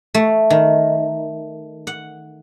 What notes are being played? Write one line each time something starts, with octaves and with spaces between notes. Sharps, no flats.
A3
D#3
F#5